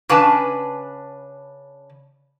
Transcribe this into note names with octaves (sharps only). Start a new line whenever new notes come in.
C#3 D4 B4 G#5 A5